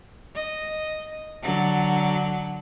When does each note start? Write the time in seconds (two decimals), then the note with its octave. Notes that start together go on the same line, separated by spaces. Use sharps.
0.35 D#5
1.42 D3 F#3